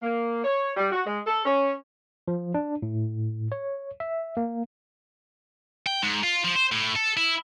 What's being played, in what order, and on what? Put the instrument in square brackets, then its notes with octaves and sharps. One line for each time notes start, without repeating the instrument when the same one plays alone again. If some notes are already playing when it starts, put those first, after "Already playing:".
[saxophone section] A#3
C#5
G3
F#4
G#3
A4
C#4
[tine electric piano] F3
D4
A2
C#5
E5
A#3
[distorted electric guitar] G5
G#2
F4
F3
C5
A2
A4
E4